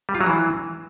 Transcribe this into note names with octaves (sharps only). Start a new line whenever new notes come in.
G3
F4
F#3
E3